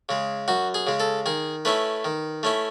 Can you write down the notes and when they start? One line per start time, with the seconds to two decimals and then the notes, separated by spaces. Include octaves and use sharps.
0.09 C#3 G#3
0.48 F#2 F#4
0.74 G#4
0.87 C#3 G#3
1.00 A4
1.26 D#3 G#4
1.65 A3 C#4 E4 B4
2.04 D#3
2.43 A3 C#4 E4